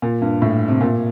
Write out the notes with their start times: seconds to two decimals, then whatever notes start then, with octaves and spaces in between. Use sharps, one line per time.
0.02 A#2
0.22 G2
0.42 A2
0.68 C3
0.81 A#2